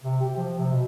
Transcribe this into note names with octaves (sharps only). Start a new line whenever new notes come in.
C3
G4
F3
C3
B2